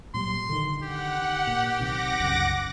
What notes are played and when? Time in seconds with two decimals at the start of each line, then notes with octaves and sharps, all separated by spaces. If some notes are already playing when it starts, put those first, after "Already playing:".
0.14 A#2 F#3 G3 C6
0.49 D3 D#3
0.82 G4 F#5
1.47 A#2
1.79 B1 C3 D#3 F#5 D6 A#6
2.20 C2 F#2 C#3